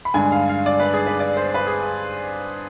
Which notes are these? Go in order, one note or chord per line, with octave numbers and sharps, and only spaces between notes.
B5
G2 D3 G#3 D4 G#5
F5
F5
D5
B4
G#4
B4
D5
C5
B4
G#4